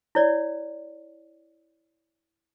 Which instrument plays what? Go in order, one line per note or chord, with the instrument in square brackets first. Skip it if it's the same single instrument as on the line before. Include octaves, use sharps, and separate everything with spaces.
[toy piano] E4 C#5 D5